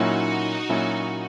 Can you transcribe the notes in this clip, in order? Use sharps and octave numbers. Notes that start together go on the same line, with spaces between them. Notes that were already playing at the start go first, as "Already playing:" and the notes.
Already playing: A#2 F#3 C#4 D#4 E4 F#4
A#2 F#3 C#4 E4